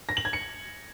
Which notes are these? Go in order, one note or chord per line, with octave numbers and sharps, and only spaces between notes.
A#6
F#7
G#6
C#7